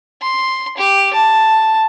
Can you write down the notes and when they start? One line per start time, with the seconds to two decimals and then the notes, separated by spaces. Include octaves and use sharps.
0.22 C6
0.77 G4
1.14 A5